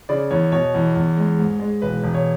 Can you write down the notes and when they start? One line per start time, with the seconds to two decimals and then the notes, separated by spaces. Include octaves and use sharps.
0.09 C#3 D5
0.30 E2 C#5
0.52 B2 C#5
0.75 E2
0.96 E2
1.17 G#3
1.39 G#2
1.60 G#3
1.82 E1 B4
2.04 E1
2.14 C#5